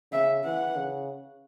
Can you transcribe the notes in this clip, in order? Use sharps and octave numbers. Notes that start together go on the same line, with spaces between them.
C#3 E5
E3 F#5
C#3